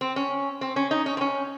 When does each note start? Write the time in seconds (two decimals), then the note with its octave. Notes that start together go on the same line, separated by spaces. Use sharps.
0.01 C4
0.16 C#4
0.61 C4
0.76 C#4
0.91 D#4
1.06 C#4
1.17 C4
1.21 C#4